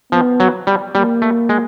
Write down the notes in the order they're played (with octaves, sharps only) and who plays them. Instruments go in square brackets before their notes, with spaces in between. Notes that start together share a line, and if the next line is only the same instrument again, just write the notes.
[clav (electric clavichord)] F3 [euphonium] B3
[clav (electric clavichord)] F#3
G3
[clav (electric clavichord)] G3 [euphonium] A#3
[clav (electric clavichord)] A3
G#3